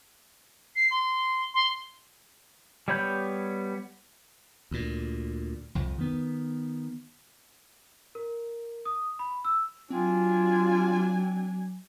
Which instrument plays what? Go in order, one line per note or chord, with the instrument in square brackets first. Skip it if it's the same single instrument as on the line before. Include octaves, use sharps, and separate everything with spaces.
[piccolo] C7
C6
C6
[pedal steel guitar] G3 B3 C#5 B5 G6
[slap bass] D2 A#2
C2 F2
D#3 B3
[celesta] A#4
D#6
B5
E6
[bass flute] F#3 [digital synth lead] C4 [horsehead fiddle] D4 G#5 [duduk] F4